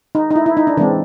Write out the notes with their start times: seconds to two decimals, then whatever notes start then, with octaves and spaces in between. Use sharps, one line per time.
0.15 D#4
0.31 D#4
0.36 E4
0.46 E4
0.57 D#4
0.67 D4
0.77 E3 G#3 C4 D4